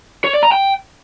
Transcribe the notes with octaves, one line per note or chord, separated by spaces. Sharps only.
C#5
D5
A#5
G5